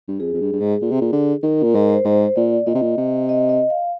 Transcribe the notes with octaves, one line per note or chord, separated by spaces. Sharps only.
G2
F2 G#4
F2
G2
G2
G#2
A#2
C3
A#2
D3
D#3 A#4
A#2 A#4
G#2 A#4
C5
G#2 C5
A#2 D5
A#2 D#5
C3
A#2
C3
D#5
D#5
F5